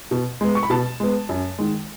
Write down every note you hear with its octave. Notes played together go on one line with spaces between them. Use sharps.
B2
G#3 B3
C#6
B5
B2 A5
G#3 B3
F#2
D#3 G#3